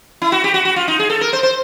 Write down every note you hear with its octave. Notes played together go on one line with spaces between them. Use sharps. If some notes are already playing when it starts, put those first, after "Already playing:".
E4
F#4
G4
F#4
F#4
F4
D#4
G#4
A4
A#4
C5
C5